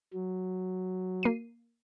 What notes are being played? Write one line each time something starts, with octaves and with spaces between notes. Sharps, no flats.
F#3
A#3 C7 D#7